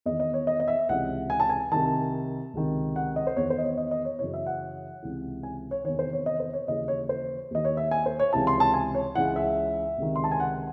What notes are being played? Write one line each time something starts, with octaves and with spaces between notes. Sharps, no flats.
E2 D#3 D#5
D#5
C#5
D#5
D#5
E5
C#2 C3 E3 F#5
G#5
A5
G#5
C2 C3 D#3 A5
C#2 C3 D#3
F#5
D#5
C5
E2 D#3 C#5
C5
D#5
C#5
D#5
D#5
C#5
F#2 C#3 E3 C#5
E5
F#5
C#2 C3 E3
G#5
C#5
E2 C3 D#3 C#5
C5
C#5
D#5
C5
C#5
D#2 C#3 E3 D#5
C#5
C5
D#2 D#3 D#5
C#5
E5
G#5
C5
C#5
C#2 C3 E3 A5
C6
A5
G#5
C#5
C#2 C#3 E3 F#5
E5
C#2 C3 D#3
C6
A5
G#5
F#5